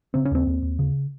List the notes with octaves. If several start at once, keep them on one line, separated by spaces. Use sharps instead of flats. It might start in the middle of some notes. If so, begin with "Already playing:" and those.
C#3 C4
C#4
D#2 C4
D#2
D#2
C#3